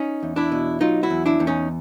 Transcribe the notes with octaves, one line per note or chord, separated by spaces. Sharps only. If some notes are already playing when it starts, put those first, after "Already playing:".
Already playing: C#4 D#4
E2
D4 E4
B2
F#3 D#4 F4
E4 F#4
E2
D4 E4
E2
C#4 D#4